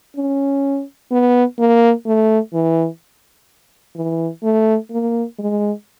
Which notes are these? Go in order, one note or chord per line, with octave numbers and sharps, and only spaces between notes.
C#4
B3
A#3
A3
E3
E3
A3
A#3
G#3